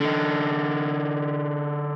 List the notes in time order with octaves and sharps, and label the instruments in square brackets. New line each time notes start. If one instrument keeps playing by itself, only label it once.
[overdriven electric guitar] D3 D#4